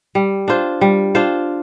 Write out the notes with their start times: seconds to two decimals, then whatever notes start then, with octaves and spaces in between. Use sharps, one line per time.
0.15 G3
0.48 D4 F4 C5
0.81 G3
1.15 D4 F4 C5